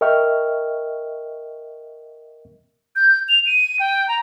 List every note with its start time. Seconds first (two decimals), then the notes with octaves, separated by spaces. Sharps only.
0.01 A#4 D#5 E5 G5 C#6 F6
2.96 G6
3.29 F7
3.46 D#7
3.80 G5
4.08 A#5